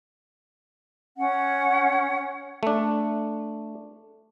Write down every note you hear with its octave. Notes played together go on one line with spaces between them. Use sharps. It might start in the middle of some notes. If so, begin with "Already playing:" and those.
C#4 F#5
A3 D4